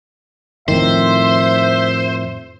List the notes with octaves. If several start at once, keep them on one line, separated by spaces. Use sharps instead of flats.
F2 A2 D#3 C5 E5